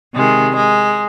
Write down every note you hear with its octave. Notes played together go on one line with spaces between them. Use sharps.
C3 D#3 G#3
G#3